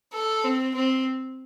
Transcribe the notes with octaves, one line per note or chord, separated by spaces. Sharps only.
A4
C4
C4